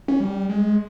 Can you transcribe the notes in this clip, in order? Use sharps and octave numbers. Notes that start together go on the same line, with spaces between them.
C#4
G3
G#3